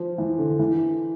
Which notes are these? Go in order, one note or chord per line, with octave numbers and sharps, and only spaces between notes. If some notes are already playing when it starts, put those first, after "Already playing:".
Already playing: F3
E3
D3
E3